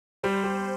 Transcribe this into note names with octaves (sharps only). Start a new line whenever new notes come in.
G3 C5
G3